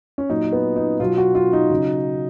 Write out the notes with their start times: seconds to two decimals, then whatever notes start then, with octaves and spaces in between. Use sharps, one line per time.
0.18 C#4
0.30 A#2 F#3 D#4
0.52 B3
0.76 D#4
1.00 B2 F#3 F4
1.18 F#4
1.35 F4
1.53 D#4
1.70 C#3 F#3